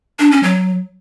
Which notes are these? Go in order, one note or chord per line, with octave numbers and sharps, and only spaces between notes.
D4
C#4
F#3